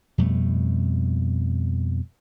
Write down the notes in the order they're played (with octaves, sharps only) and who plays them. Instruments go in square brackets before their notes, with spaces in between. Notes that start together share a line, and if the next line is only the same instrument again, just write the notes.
[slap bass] F2 B2 G3 A3